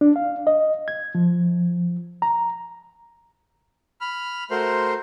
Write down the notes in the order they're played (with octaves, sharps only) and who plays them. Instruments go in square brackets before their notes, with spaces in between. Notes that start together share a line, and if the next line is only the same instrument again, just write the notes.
[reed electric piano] D4
F5
D#5
G#6
F3
A#5
[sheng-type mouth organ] B5 F6
A3 F#4 A#4 C5 C6